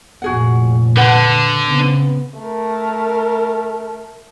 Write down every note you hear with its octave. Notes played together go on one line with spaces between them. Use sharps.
F1 A#2 F3 F#4 G#4 F#5
D3 B4 F#5 A5
C#3 B3 C4
A3 A#4